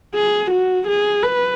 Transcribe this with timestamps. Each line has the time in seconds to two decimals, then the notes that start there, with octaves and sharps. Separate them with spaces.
0.15 G#4
0.51 F#4
0.87 G#4
1.23 B4